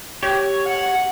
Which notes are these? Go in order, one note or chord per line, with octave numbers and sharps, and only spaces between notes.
G4 C#5
F#5